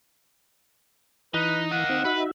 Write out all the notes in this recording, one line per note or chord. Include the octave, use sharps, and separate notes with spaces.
E3 D#4 B4
D#5 F5 F#5
C4 D#4
D#4 F#4 B4 E5